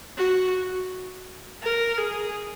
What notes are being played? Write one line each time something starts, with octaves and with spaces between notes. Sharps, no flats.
F#4
A#4
G#4